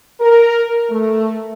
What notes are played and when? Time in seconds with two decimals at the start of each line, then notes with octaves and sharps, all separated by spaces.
0.20 A#4
0.89 A3